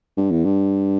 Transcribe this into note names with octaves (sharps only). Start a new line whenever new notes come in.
G2
E2
G2